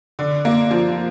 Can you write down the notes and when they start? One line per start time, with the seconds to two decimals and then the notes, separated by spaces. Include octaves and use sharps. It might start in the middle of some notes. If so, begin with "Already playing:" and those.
0.19 D3
0.45 A#3
0.71 F3